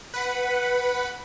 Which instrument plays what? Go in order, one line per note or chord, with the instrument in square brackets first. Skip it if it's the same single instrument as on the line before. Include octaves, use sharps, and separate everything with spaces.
[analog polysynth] B4 F#5 B5